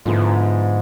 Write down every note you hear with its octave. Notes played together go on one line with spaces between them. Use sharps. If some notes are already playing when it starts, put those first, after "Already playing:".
G#2 D3 F3 G#3 B3 E4